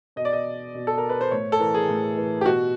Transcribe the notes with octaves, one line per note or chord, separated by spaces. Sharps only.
B2 D#5
D5
D#5
B2
A4
A#4
B4
C5
A2 C#5
A4
E3 A#4
G#4
A2
E3
G4
B2 F#4